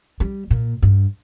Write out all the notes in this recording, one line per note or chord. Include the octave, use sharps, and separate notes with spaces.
G3
A#2
G2